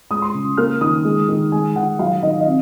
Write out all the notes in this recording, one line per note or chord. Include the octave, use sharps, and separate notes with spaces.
G#3 D#6
C6
C#3
A#3 F6
D#3 D#6
G#3
D#3
G#3 G#5
D#3 F#5
F#3 F5
D#3 D#5
D#5
C4